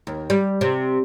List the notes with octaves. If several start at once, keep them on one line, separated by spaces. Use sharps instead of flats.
D#2
G3
C3